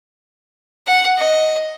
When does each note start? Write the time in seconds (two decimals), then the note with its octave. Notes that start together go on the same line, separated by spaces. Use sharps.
0.87 F#5
1.18 D#5